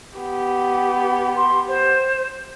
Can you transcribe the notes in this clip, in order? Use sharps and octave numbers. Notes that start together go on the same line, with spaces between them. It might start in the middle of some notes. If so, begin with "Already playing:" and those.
B3 G4
C6
C5